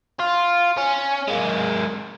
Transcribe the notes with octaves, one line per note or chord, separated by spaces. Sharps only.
F4
C#4
G#3 A#3